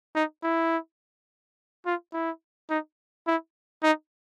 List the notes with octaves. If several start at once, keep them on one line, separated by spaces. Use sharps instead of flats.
D#4
E4
F4
E4
D#4
E4
D#4